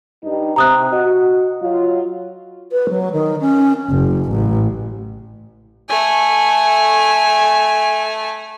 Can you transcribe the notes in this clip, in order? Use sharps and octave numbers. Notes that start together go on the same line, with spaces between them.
G2 G3 D#4
C3 A#5 D#6 F#6
F#4 D#5
F#3 F4
B4
F#3
D#3
C#4
F#1
A1
A3 G#5